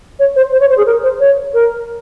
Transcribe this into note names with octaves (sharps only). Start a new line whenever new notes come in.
C#5
C5
C5
C#5
C5
G#4
A#4
C5
C#5
A#4